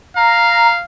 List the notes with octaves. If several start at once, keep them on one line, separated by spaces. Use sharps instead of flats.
F5 A#5